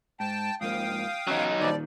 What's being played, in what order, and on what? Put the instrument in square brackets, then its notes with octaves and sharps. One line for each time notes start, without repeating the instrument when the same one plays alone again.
[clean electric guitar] G#2 [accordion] G5 A5
[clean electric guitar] G#2 F3 A#3 [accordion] F5 G5 D#6
[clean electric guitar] E2 C#4 [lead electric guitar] F#3 D#4
[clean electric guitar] A#2 D#3 [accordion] F3 G3 D5